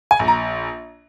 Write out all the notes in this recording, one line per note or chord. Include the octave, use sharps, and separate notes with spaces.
G#5
A#1
A#5